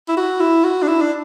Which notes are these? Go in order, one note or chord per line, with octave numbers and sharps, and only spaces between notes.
E4
F#4
E4
F#4
D4
E4
D4